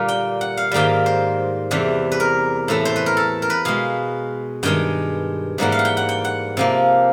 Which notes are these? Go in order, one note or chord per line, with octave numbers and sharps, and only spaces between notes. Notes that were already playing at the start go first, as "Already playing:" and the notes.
Already playing: A#2 D3 G3 A#3
G5
F#5
F5
G#2 D#3 G3 A#3 G5
C5
E2 C3 E3 G3
B4
A#4
A2 E3 A3
C5
B4
A#4
A4
A#4
B4
B2 G#3 F5
G2 D#3 G#3 G5
G#2 E3 G3 A#3 F#5
F5
F#5
G5
F#5
G5
F#5
C3 F3 A#3